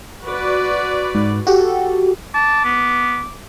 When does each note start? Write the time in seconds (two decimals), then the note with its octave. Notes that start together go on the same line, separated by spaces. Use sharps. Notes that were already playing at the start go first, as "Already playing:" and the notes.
0.23 F#4 B4 D5
1.15 G#2
1.47 F#4 G4 A4
2.34 A5 D6
2.65 B3